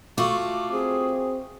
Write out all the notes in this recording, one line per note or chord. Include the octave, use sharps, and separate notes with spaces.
A3 F4 F#4 D6
C4 G#4